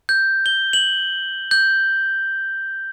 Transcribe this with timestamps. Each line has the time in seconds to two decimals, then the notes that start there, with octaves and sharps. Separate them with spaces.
0.09 G6
0.46 G7
0.73 F#7
1.51 G6